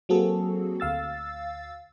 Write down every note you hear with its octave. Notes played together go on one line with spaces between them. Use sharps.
F#3 A#3 C4 F#4 G#4 A4
D2 F5 E6 A6